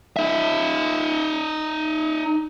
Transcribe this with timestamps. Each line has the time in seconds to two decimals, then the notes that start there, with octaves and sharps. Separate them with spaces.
0.17 D#4 E5